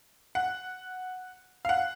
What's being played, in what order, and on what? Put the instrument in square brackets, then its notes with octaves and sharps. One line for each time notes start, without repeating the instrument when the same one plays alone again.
[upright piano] F#5
F5
F#5